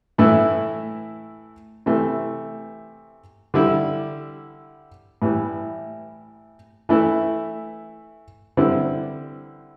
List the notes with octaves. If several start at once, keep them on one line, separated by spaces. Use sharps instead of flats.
A2 E3 A3 E4
C3 E3 A3
D3 G3 E4
A2 E3 G3
E3 A3 E4
D3 G3 C4 E4